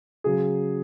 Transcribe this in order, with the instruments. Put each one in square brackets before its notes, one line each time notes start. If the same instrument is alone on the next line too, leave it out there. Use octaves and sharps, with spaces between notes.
[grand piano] C#3 F#3 G#4